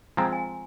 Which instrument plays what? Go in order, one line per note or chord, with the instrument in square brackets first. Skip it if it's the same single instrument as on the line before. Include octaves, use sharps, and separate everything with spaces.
[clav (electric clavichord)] F3 G#3 C4 [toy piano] A#5
[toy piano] G#5